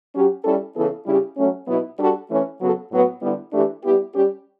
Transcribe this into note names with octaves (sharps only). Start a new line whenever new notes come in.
F#3 C#4 G4
G3 C#4 E4 A4
C#3 E3 B3 E4 A4
C#3 G3 C#4 E4 G4
F#3 A3 C#4
B2 F#3 B3 E4
G3 D4 F#4 A4
E3 A3 C#4
C#3 F#3 B3 F#4 A4
A2 F#3 B3 F#4
D3 G3 B3 E4 G4
E3 A3 D4 G4
G3 B3 E4 G4
G3 C#4 G4